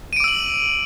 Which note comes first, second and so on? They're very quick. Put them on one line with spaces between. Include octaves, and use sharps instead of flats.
D#7 D7 D6 E6 F#7